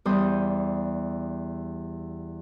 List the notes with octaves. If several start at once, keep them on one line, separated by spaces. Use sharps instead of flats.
E2 G3 C5 D#6